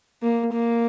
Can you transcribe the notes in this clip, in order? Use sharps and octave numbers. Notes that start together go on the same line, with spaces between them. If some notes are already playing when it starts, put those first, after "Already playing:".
A#3
A#3